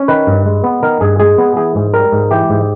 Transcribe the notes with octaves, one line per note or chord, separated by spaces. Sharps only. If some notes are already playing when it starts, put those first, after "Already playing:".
Already playing: C#4
D#3 B4
G2
G#3
B3
D#3 A#4
G2 G#4
G#3 G#4
B3
E3 G#4
G#2
G3 A#4
G#2
E3 G4
G#2